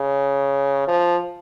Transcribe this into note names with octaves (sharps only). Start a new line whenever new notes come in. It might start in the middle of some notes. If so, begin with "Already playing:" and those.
Already playing: C#3
F3